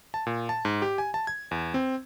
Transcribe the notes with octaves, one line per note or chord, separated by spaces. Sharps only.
A5
A#2
A5
G#2
G4
G#5
A5
G#6
E2
C4